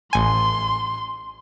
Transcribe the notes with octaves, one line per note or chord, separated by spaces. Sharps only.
A1 G#5 C6